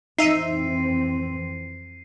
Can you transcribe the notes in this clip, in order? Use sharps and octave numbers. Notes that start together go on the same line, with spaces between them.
F2 E3 C4 D#4 E5 C7 D#7